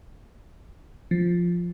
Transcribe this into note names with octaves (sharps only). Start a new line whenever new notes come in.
F3